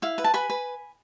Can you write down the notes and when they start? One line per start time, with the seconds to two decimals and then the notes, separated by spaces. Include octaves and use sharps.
0.02 E4 F5
0.18 B4
0.24 A5
0.34 B4 G#5 B5
0.50 B4